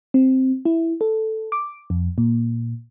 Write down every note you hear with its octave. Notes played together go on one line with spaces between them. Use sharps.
C4
E4
A4
D6
F2
A#2